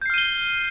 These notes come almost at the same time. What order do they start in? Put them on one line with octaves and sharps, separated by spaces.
G6 C7 F6 D#7 G7